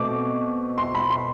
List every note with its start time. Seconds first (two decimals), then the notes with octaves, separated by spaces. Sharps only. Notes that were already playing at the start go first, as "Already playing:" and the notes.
Already playing: B2 A3 C4 D6
0.78 C6
0.95 B5
1.10 C6